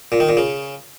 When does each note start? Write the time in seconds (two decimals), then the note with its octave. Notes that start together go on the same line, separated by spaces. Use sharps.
0.12 A#2
0.20 D#3
0.29 A#2
0.37 C#3